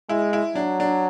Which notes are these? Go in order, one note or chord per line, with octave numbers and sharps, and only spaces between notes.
G#3 E4
E4
F#3 D4
D4